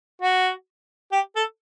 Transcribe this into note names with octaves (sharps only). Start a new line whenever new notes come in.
F#4
G4
A4